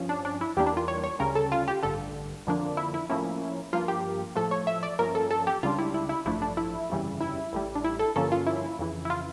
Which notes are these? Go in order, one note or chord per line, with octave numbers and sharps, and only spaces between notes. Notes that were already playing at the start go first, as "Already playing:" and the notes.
Already playing: G2 F3 C#4
D4
D4
E4
E2 E3 G3 A#3 D4 G4
D4
F4
C#5
C#5
D2 C#3 G3 C#4 A#4
A4
F4
G4
A1 G2 D3 A4
F2 D3 F3 A#3 D4
E4
E4
A2 F3 A#3 C#4 E4
G2 F3 A#3 F4
G4
A2 F3 A3 A4
C#5
E5
D5
G2 F3 A#3 C#4 A#4
A4
A4
G4
C#2 C#3 G3 D4 F4
E4
E4
E4
A1 G2 F3 A3 D4 E4
D4
E4
G1 F2 C#3 E3 G3
E4
A1 A2 G3
D4
E4
A4
G2 D3 F3 A#3 C#4 A4
F4
E4
F2 C#3 E3
E4
F4